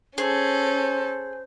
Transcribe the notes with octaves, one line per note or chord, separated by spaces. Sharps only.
C#4 G#4 A4 C5